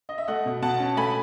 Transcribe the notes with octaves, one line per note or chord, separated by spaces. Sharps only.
D#5
E5
A3 D#5 F#5
B2
B2 F#5 A5
C#4
A3 G#5 B5